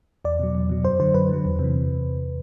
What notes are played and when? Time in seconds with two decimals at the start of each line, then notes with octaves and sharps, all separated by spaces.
0.25 E2 D5
0.40 B2 F#3
0.55 E2
0.69 B2 F#3
0.85 F#2 C5
1.00 D3 F#3 C5
1.14 F#2 B4
1.29 D3 F#3
1.45 E2
1.59 C3
1.64 E3